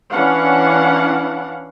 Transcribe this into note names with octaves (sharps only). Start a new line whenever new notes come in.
E3 C#4 D4 F5 F#5